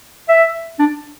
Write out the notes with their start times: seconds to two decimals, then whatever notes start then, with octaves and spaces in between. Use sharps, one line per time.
0.29 E5
0.79 D4